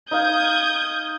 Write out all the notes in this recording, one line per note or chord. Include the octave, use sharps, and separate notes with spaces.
D#4 F5 D#6 G6 G#6